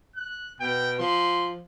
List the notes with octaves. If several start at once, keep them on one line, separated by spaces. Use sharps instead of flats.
F#6
B2 G5
F3 C6